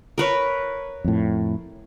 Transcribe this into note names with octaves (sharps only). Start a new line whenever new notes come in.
A#4 B4 C#5
F2 A2